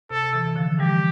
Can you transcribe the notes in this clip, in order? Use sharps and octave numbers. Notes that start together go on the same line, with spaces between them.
C3 A4
C3 E3
D3 F3
E3 G3 G4